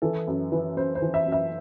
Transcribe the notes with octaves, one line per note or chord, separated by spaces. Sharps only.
E3 A4
F#2
E3 B4
F#2 C5
C5
E3
E5
F#2
E5